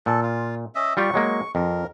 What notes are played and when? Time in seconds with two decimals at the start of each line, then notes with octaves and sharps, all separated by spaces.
0.06 A#2 A4
0.23 F4
0.75 C#4 D#5 E5
0.97 G3 F4 G4 C#6
1.14 F#3 G#3 A#3
1.55 F2 A#4